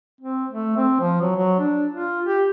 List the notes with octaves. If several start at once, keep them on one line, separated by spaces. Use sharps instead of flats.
C4
A3
C4
F3
F#3
F#3
D4
F4
G4